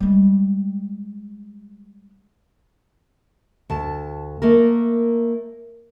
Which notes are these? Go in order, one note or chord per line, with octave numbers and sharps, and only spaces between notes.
G3 G#3
D2 A5
A3 A#3 A#4